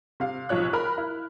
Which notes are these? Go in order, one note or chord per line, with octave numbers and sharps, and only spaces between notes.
C3 F5
B1 F3 C#5 F#6
A#4 B5 F6
E4